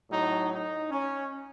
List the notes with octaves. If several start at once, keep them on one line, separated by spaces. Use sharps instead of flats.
A2 F#3 D#4
D#4
C#4